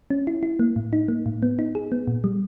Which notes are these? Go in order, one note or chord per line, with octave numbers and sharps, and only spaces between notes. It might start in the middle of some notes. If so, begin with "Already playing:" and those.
C#4
E4
E4
A#3
A2
D#4
A#3
A2
B3
D#4
G#4
B3
A#2
G3